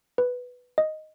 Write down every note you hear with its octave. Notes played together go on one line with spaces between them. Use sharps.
B4
D#5